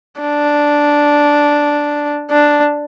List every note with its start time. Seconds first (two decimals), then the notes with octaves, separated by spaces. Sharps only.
0.21 D4
2.30 D4